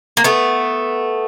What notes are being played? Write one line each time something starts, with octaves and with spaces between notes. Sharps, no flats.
A#3
A3 B3